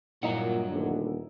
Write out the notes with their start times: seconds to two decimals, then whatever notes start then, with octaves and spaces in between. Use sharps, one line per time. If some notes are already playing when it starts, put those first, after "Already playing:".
0.23 G2 A#2 F#3 E4 D#5 F#5 A#5
0.70 D#1 D2 D3